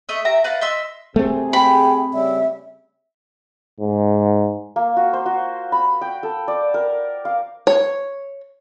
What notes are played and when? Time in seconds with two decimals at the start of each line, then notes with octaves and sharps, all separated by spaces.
0.09 A3 D#5 E5
0.25 G4 E5 A#5
0.44 B4 D5 F5 F#5
0.61 D#5 E5 C6 E6
1.16 C3 A3 C4 G#4
1.53 G5 B5
2.14 C#3 G3 E5
3.81 G#2
4.76 A#3
4.97 F#4
5.13 C5
5.26 F#4
5.72 B5
6.01 G5
6.23 A4
6.48 D5
6.74 A#4
7.25 F5
7.67 C#5